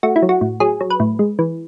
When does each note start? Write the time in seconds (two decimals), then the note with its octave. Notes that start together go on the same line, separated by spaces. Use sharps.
0.03 A3 F#4
0.16 E4
0.22 F#3
0.29 F#4
0.41 A2
0.60 F#3 G#4
0.81 F#3
0.90 B4
1.00 A2
1.19 G#3
1.39 E3